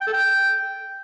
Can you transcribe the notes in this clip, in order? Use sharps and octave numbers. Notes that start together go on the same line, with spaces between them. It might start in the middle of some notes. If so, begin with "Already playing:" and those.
G5
A4
G5